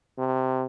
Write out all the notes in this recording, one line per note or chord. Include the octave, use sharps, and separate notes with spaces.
C3